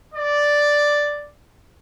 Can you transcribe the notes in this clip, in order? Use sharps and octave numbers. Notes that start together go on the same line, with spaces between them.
D5